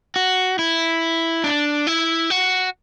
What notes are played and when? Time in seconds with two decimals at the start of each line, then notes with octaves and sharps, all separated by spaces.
0.16 F#4
0.59 E4
1.44 D4
1.87 E4
2.30 F#4